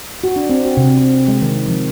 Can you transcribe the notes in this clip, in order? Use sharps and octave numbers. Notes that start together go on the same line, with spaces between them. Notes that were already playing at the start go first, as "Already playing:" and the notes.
F#4
D4
C4
F#4
C3
C4
G#3
D#3
F3